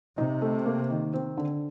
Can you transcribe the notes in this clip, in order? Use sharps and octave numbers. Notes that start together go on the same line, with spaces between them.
C3 D#4
A3
A#3
D#3
C4
D3